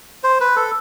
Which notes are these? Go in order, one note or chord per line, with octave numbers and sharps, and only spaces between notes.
C5
B4
A4